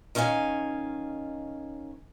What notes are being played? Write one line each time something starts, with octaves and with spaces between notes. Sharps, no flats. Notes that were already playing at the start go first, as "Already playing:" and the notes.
D#3 C#4 F5 G5 G#5